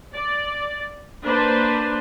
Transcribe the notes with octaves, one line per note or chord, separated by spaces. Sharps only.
D5
A#3 D4 B4 C5